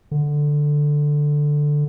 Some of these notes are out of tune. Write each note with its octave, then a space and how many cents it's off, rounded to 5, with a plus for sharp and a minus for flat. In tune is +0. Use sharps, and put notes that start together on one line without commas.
D3 +5